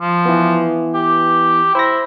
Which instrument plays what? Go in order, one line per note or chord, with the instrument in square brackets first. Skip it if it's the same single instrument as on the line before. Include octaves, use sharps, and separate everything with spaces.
[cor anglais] F3
[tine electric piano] E3 B3
[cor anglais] G4
[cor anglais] E4 [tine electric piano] C5 A#6